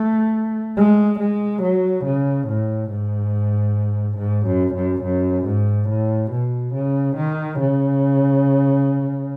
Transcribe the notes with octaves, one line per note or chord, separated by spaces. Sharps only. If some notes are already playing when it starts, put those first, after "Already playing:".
Already playing: A3
G#3
G#3
F#3
C#3
A2
G#2
G#2
F#2
F#2
F#2
G#2
A2
B2
C#3
D#3
C#3